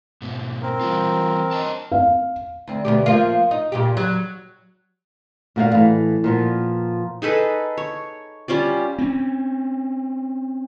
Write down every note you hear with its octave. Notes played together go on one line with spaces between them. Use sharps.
G#2 B2
C4 A#4
E3 G3 F4
C#5 D#5 A5
F5
D2 C4
D2 B2 G4
F3 A#3 F4
D#4
A#2 C#3 G4
F#3
A#2 F#4 C5 F5
A2 E3
A#2 F3 B3
D#4 G#4 A4 B4
C#5
G3 C#4 F4 D5
C4 C#4